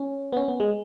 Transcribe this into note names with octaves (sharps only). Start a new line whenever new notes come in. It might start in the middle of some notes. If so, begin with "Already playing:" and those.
Already playing: C#4
B3
C#4
B3
G#3